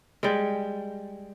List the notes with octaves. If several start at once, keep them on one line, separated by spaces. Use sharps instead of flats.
G3 G#3